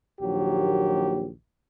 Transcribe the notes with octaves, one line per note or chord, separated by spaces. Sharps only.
A#1 D#2 F#3 G4